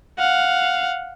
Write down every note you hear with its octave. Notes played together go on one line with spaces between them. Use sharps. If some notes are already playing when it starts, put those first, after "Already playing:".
F5 F#5